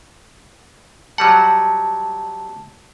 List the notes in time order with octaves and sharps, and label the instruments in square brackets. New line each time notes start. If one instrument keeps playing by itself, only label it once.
[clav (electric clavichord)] F#3 G3 F#5 [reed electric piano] A5